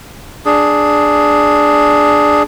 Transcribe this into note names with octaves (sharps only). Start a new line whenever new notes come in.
D4 G#4